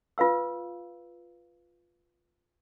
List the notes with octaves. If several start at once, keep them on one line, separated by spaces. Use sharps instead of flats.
F4 B4 F5 E6